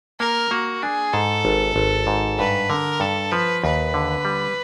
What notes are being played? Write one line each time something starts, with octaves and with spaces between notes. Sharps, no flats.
A#3 A#4
A#3 F#4
D4 G#4
G#2 A4
G#1
G#1
G#2
G2 B4
D3 A#4
G2 A4
F3 B4
D#2 B4
D3
G3